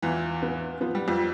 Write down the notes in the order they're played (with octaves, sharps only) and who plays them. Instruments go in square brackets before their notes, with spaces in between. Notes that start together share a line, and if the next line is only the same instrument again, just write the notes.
[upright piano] E2 E3 [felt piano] F4
[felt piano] B3
[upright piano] F3 [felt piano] B3
[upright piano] G3
F2 F3